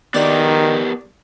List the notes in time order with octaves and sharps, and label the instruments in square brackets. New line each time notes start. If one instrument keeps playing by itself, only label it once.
[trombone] D#3 [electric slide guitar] B3 G4 A#4 [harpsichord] D5